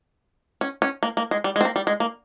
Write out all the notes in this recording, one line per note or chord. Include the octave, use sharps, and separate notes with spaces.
C#4
C#4
A#3
A#3
G#3
G3
G#3
C4
A#3
G3
G#3
A#3